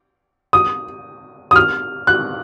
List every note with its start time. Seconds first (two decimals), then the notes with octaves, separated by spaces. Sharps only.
0.53 D#6
1.51 D#6
1.56 F6
2.07 F#6